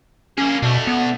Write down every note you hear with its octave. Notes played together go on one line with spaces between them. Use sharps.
A#3 C#4 G#4
B2 A3 D4
B3